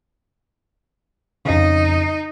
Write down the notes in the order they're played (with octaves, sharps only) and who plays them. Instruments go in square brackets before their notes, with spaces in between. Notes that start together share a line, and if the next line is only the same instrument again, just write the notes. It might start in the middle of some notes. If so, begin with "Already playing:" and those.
[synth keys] F2 C#3 [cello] D#4